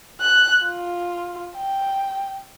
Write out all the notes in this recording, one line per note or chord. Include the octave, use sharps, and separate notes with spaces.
F#6
F4
G5